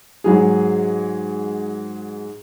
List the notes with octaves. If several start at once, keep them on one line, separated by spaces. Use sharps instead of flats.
G#2 F#3 G#4